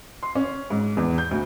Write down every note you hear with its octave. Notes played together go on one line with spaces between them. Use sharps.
C6
C#4
G#2
E2
G6
D2